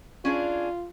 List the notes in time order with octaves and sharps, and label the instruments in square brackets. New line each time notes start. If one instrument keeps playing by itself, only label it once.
[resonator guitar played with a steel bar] C#4 D4 G#4 [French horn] F4